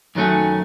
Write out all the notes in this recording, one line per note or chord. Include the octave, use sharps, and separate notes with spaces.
F#2 D#3 F#3 A3 C#4